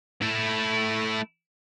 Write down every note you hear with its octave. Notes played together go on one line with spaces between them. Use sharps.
A3 E4